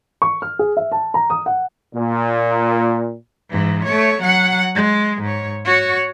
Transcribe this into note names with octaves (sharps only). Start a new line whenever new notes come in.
C#6
F6
G#4
E5
A5
A#5
D#6
F#5
A#2
G#2 E3
A3 C#5
F#3 F#5
G#3
G#2 C#5
F#4 C#5